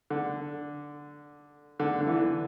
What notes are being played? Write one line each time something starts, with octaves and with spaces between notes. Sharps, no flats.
D3
D3
D3
E3